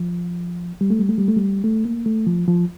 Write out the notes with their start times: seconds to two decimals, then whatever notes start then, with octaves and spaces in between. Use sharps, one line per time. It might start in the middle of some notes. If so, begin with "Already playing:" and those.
Already playing: F3
0.81 G3
0.90 A3
0.99 G3
1.09 A3
1.18 G3
1.28 A3
1.36 G3
1.64 A3
1.85 A#3
2.06 A3
2.27 F3
2.48 F3